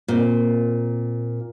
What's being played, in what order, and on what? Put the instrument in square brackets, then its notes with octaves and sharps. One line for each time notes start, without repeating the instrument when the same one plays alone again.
[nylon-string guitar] A#2 A#3 C4